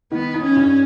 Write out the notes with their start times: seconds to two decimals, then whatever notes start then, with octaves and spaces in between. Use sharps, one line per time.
0.12 D#3 B3
0.34 D#4
0.45 C#4
0.56 G2